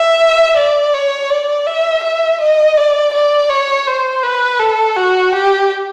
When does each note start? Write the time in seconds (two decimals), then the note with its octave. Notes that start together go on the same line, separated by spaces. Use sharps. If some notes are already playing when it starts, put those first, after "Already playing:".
Already playing: E5
0.57 D5
0.93 C#5
1.30 D5
1.66 E5
2.03 E5
2.41 D#5
2.77 D5
3.13 D5
3.49 C#5
3.87 C5
4.23 B4
4.59 A4
4.96 F#4
5.33 G4